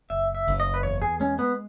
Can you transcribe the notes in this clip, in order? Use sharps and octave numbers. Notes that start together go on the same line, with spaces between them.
F#1 E5
E5
F#1
D#5
B4
E2 C#5
G#4
G#3 C#4
B3